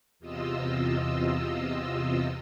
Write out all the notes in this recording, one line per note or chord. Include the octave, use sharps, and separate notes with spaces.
E2 C3 F4 D#5 E6